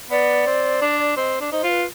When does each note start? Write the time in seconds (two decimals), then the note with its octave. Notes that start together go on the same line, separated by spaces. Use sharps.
0.11 B3 D5
0.47 C4
0.82 D4
1.17 C4 D#5
1.41 D4
1.52 D#4 C5
1.63 F4
1.69 B4